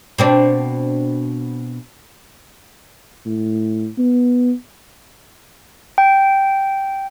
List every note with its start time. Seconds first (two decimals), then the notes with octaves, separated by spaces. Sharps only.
0.18 B2 C4 D4
3.26 A2
3.98 B3
5.98 G5